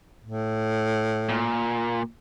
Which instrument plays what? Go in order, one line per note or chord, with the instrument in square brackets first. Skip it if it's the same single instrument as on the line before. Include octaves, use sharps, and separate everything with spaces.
[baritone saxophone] A2
[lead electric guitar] A#2